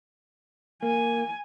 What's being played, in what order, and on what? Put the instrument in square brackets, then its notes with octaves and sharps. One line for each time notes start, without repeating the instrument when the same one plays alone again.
[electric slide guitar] A#3 [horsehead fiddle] G#5